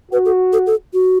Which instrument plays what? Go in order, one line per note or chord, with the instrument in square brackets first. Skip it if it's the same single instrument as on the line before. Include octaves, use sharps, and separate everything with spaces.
[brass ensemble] F#4 [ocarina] B4
[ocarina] A4
A4
A4
F#4